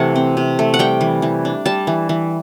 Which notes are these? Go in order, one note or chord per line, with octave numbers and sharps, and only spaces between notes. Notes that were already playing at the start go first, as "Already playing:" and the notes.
Already playing: C3 E3 A3 F#5
C4
C3
A3
F#5
G3 G5
E3
E3
D4
G3 A5
E3
E3